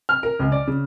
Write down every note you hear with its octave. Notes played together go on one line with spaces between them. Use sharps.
F6
A#4
C#2
D5
C#3